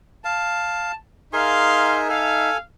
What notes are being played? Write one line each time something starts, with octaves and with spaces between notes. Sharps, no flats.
F5 A5
D#4 G#4 A#4 E5 F5 G#5 C6
A4 F5 G#5